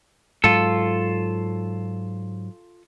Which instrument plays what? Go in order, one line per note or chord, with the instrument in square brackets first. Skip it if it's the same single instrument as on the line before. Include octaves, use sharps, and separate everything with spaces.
[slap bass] G#2 F#3 [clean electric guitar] F4 A4